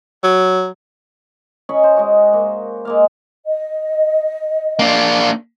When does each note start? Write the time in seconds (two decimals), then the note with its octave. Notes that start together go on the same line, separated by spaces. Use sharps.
0.24 F#3
1.69 C#4 C#5 D#5 B5
1.84 C5
1.97 G#3 F#4
2.33 A#3
2.85 G#3 A#3 F5
3.46 D#5
4.79 A#3 D4